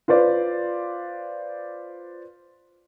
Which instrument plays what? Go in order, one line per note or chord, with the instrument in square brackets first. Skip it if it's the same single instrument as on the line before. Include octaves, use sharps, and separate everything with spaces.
[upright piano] F4 B4 C5 D5